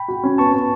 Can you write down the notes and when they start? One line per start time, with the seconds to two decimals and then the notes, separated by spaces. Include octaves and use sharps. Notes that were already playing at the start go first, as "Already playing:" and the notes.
Already playing: G5 B5
0.08 F#4
0.24 C#4
0.38 B3 A5 C#6
0.54 B3